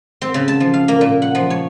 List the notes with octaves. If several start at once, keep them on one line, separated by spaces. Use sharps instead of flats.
C4
C#3
A5
F3
F5
A#3
A#2
F#5
F3
C#5